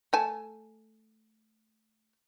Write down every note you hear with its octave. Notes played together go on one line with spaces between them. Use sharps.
A3 G#5 A5